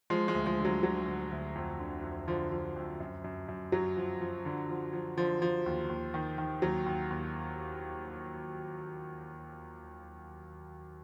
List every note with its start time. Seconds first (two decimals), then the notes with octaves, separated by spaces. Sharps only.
0.10 F3 G#3
0.28 F3 G#3
0.34 D2
0.46 F3 G#3
0.59 D3
0.65 F#3
0.83 D3 F#3
1.07 D2
1.31 D2
1.55 F2
1.79 D3
2.03 F2
2.28 D3 F3
2.52 F3
2.76 F2
3.00 F#2
3.24 F#2
3.48 F#2
3.72 F#2 F#3
3.97 F3
4.21 F3
4.45 D3
4.69 F3
4.93 F3
5.17 D3 F3
5.42 F3
5.66 D#2
5.89 D#2
6.14 D#3
6.38 D#3
6.62 D#2 F#3
6.86 D#2
7.10 D#2